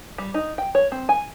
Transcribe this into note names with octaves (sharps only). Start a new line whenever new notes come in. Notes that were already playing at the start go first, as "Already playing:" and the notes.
G3
D#4
G5
C#5
C4
G#5